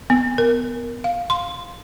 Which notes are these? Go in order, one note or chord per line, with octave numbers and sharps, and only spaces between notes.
B3
A#4
F5
C6